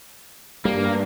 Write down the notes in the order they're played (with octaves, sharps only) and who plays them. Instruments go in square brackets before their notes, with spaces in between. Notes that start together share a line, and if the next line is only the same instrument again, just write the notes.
[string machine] G2 [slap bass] G3 [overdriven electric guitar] A#3